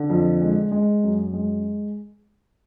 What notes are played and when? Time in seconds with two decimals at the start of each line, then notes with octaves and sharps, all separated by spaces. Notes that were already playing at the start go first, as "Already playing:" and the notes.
Already playing: D3
0.10 F2
0.42 G#3
0.72 G#3
1.04 F#2
1.33 G#3